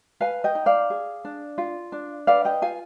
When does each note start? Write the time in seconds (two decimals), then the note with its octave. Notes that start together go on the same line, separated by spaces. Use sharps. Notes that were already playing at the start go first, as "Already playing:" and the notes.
0.21 B4 F5 G#5
0.44 D#5 G5
0.55 D#4
0.66 D5 F5
0.90 G#4
1.25 D4
1.58 F4
1.92 D4
2.27 B4 D5 F5
2.45 D#5 G5
2.62 F4 F5 G#5